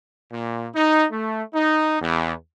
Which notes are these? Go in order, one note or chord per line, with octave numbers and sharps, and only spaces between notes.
A#2
D#4
A3
D#4
E2